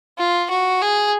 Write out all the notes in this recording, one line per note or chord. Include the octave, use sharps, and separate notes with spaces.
F4
F#4
G#4